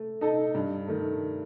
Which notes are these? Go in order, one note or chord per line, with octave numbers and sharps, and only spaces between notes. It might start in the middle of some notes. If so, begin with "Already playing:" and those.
Already playing: A3
D#4 A4 D#5
G2
D#3 A3